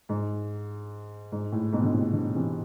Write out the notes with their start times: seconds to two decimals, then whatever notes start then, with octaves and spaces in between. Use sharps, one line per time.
0.09 G#2
1.32 G#2
1.52 A2
1.73 G#2 B2
1.83 D3
1.93 A2 C3
2.13 B2 D3
2.34 C3 E3